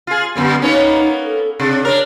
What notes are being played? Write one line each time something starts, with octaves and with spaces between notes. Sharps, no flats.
F4 G#4
F#2 D3 G3 B3
A#3 B3 C#4 D#4
A4
C3 D4 G#4
D4 A#4 C#5